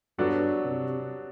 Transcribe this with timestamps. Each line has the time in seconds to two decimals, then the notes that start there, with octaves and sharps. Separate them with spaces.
0.19 G2 F#3 B3 D4 F#4 A4
0.65 C3